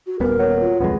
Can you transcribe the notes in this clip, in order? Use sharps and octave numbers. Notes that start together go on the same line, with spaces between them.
F#4
D#1 D#2 B3 A#4
F#3
F4
D1 F2 G#3 B3